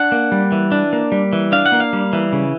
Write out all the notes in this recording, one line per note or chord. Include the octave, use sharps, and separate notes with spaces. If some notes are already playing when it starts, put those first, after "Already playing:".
Already playing: D4 F#5
A#3
G3
E3
D4
A#3
G3
E3
D4 F5
F#5
A#3
F5
G3
E3
C#3